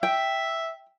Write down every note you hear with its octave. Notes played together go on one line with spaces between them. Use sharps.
E5 G5